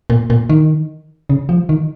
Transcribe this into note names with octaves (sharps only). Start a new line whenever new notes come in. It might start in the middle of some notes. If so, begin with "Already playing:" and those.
A#2
A#2
D#3
C#3
F3
D#3